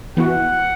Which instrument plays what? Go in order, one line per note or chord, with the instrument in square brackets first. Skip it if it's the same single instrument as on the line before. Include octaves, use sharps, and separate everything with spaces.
[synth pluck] E3 B3 F#4 [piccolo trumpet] F#5